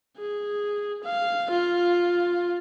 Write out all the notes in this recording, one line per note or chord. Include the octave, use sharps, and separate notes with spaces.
G#4
F5
F4